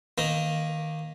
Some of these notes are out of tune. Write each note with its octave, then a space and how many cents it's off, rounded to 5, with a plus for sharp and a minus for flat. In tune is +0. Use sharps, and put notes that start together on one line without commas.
D#3 +0 A#3 +0